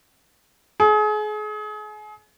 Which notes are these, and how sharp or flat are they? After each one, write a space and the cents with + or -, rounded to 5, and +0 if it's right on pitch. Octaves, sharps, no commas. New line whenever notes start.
G#4 +35